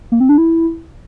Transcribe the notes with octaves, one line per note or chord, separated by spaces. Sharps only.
A#3
C4
D4
E4